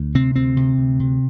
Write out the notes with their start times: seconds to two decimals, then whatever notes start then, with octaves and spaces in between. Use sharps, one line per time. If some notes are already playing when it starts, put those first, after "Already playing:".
Already playing: D2
0.15 C3 C4
0.36 D2 C4
0.57 C3
0.78 D2
1.00 C3